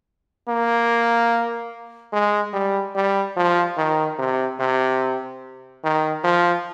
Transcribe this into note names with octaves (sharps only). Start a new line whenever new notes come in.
A#3
G#3
G3
G3
F3
D#3
C3
C3
D#3
F3